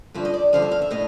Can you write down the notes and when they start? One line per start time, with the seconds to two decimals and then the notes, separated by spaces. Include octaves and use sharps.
0.14 G2 D3 F3 E5
0.25 D#5
0.34 D5
0.53 G2 D3 F3 F5
0.62 E5
0.71 F5
0.82 E5
0.91 A2 D#5